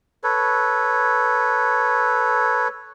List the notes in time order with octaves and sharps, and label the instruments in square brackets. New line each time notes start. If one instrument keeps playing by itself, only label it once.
[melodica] A4 B4 C#5